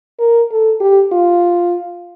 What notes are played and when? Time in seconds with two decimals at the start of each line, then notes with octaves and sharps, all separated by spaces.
0.20 A#4
0.51 A4
0.81 G4
1.12 F4